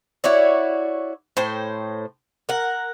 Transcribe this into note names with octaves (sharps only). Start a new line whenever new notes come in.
E4 F#4 C#5 D5
A2 C5 G5
A#4 F#5